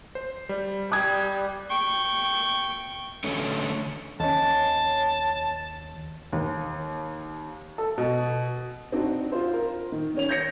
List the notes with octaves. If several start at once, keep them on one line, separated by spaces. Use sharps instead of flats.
C5
G3
G3 D6 D#6 F#6 G#6
G5 C#6
D3 A3 C#4
D#2 C#4 A5
D#2
A4
B2
C4 D4 D#4 F#4
F4 C5
A#4
D#3
D#3 C#4 F7
G6 A#6 C#7